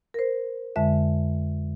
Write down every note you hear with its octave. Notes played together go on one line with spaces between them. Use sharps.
A#4 C5
F2 D3 G#3 E5